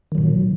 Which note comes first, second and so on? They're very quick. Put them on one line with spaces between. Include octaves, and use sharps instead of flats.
D#3 F#3 A#2